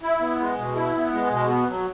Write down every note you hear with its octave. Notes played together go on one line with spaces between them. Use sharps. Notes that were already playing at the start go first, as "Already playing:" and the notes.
E4
B3
G#3
B2
E4
B3
G#3
B2
B3
F#3